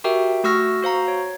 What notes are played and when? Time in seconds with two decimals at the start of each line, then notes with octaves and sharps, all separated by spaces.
0.04 F#4 G4 A#4 E5 G5
0.44 A3 F#4 C#6 E6 F6 A#6
0.82 F#4 C5 F5 A#5
1.08 C#5